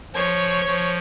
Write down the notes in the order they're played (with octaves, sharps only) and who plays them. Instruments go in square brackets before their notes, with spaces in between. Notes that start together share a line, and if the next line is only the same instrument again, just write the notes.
[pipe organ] F3 [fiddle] C#5
[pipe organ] F3